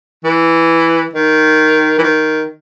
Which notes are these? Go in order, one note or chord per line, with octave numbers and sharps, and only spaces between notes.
E3
D#3
E3
D#3